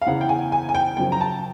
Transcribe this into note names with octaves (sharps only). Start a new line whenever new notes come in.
F5
E2 C#3 E3 F#5
G5
G#5
G#5
G#5
G5
F#2 C#3 F3 G5
A#5
A5